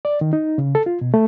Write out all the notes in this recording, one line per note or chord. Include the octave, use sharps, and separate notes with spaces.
D5
D#3
D#4
C#3
A4
F4
B2
A3